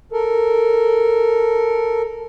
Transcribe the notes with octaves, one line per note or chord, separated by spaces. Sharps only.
A4 A#4